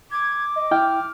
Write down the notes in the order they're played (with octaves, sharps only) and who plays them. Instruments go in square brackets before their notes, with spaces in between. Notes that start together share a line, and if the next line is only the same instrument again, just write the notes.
[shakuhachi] D6 [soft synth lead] G#6
[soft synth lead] D#5
[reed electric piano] E4 G5 [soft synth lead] F6